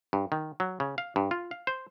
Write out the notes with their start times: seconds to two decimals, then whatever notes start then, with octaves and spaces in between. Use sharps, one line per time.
0.13 G2
0.32 D#3
0.60 F#3
0.80 C#3
0.98 F5
1.16 G2
1.31 F4
1.51 F5
1.67 C5